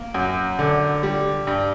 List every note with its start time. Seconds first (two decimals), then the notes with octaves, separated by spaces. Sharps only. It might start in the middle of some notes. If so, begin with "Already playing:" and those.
Already playing: A#3
0.14 F#2
0.59 D3
1.03 G3
1.47 G2